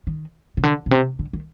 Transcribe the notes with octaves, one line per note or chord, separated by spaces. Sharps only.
D#3
C3
D3
A#2
C3
D3
D#3